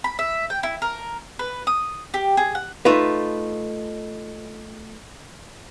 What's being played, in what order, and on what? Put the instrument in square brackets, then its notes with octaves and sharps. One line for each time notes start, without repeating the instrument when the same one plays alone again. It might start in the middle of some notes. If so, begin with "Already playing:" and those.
[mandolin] B5
E5
G5
E4
A#4
B4
D#6
G4
G#4
F#5
[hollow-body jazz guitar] A3 D#4 F4 B4